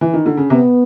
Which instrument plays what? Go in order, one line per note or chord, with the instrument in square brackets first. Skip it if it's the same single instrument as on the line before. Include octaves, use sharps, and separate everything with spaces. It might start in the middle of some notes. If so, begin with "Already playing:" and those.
[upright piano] E3
D#3
D3
C#3
[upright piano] C3 [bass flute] B3